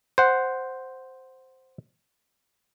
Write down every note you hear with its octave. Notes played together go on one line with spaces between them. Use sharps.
C5 F#5